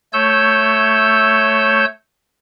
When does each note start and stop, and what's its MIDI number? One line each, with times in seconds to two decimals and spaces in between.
0.13 1.85 57
0.13 1.85 73
0.13 1.85 88
0.13 1.85 91